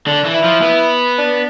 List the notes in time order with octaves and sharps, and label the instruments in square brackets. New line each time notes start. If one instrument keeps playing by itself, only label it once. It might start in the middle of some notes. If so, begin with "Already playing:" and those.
[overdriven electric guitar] D3 [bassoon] D4
[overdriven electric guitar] E3
[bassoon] E4
[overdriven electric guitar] F3
B3
[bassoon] D4